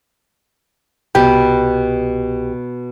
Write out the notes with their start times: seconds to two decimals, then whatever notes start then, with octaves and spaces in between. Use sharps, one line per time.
1.15 C2 B2 G4 B4 G5